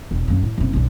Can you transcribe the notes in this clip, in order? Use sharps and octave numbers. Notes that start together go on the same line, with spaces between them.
E1
F#2 A#3
A2
F#1 C3
B1 F#2